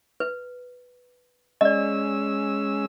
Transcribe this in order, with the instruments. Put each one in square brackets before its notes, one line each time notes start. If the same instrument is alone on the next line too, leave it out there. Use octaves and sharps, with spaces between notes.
[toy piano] B4
[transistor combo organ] G#3 C#4 E6 [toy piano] D5 D#5